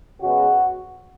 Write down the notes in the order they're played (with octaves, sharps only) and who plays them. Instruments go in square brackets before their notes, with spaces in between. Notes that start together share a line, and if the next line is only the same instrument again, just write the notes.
[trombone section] C#3 G#3 B3 F#4